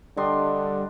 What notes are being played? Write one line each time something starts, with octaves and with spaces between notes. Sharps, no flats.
D3 G3 D4 D#5 C6